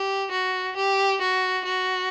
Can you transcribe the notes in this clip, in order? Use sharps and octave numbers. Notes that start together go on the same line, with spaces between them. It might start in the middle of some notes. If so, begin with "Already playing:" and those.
Already playing: G4
F#4
G4
F#4
F#4